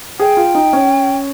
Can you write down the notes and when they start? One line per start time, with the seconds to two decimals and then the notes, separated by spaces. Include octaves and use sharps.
0.20 G#4 G5
0.37 F4
0.55 D#4
0.73 C#4